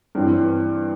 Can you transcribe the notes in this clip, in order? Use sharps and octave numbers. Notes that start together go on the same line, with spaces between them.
G2 E3 C4